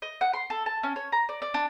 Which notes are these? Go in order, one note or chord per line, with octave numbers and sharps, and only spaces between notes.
D#5
F#5
C6
A4
A5
C#4
C#5
A#5
D5
D5
D4